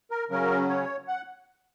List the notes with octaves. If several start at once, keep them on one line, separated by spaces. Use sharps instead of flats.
A#4
C#3 F#3 C#4 A#4
C#5
F#5